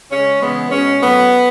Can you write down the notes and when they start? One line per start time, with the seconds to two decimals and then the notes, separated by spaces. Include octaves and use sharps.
0.10 C#3 G#3 C#4
0.41 C#3 E3 G#3 B3
0.70 B2 G#3 C#4
1.01 A2 F#3 A3 B3